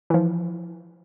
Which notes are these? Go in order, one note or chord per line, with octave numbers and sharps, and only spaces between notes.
E3 F3